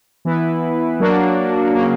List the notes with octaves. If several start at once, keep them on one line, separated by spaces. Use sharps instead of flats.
E3 B3 E4 B4
F#3 A#3 D4 F#4
C#3 F#3 A#3